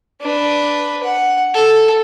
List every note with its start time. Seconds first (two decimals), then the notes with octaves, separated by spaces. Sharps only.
0.21 D4 B4
1.03 F#5
1.54 A4